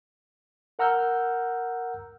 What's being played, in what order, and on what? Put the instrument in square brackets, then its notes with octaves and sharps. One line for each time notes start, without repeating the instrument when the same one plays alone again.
[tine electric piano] A#4 F#5 A#5 E6 F6 G6